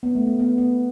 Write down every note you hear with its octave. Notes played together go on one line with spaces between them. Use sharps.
B3
A3
B3
B3
B3